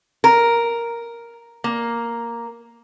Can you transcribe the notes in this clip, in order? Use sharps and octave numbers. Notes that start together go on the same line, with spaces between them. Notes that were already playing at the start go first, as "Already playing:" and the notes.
A#4
A#3